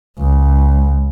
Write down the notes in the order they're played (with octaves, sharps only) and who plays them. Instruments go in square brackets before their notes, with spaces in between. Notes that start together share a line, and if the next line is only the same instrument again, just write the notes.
[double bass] C#2